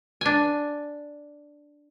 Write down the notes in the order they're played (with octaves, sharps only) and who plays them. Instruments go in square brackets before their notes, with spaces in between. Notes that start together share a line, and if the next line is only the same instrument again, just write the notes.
[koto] D4 G#5